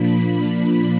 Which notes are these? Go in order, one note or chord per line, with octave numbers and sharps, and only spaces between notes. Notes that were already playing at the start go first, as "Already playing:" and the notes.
Already playing: A#2 F3 A#3 D4 B5
B5